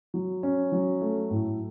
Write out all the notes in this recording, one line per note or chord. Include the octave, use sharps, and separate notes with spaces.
F#3
C#4
F#3
A3
A2